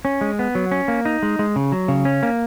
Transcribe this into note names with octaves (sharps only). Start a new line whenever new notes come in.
C#4
G#3
B3
F#3
C#4
A#3
D#4
G#3
G#3
C#3
F#3
C#3
C#4
A#3